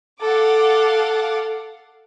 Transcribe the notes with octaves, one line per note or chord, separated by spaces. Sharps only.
A4 F5 F#5 D6